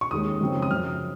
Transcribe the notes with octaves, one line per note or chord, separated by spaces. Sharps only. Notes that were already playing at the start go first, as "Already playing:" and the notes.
C#6
D#2 D#3 G#3 C#4 D#6
F#2 C#3 F3 C4 D#4
D#6
F#2 C#3 F3 F6